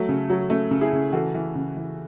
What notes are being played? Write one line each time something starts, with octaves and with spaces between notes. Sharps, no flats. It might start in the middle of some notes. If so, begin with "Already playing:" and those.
Already playing: F#3 A3
C#3
F#3
C#3 A3
C#3
E4 G#4
C#3
E3 F#4 A4
E3
C#3
E3